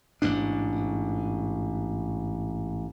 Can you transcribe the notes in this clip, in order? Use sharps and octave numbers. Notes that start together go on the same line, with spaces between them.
A1 G#2 B2 D4